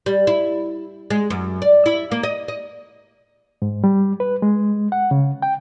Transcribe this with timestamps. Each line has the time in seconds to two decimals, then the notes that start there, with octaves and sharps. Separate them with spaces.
0.06 G3
0.27 E4
1.10 G#3
1.30 F#2
1.62 D5
1.86 E4
2.12 A#3
2.23 D#5
2.48 D#5
3.62 G#2
3.84 G3
4.20 B4
4.42 G#3
4.92 F#5
5.11 C#3
5.42 G5